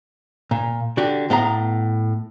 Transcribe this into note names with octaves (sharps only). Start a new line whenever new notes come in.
A#2
D3 F#4 G4
A2 B3 F5 A#5